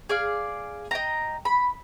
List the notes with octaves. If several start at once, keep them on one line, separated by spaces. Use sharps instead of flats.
G#4 D5 F5
D#5 G5 A#5
B5